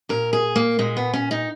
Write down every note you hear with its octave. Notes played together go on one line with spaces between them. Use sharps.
A#2 A#4
G#4
A#3
A#2 G#3
B3
C#4
D#4